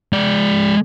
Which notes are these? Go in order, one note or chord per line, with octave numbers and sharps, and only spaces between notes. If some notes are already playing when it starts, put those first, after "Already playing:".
G#3 D5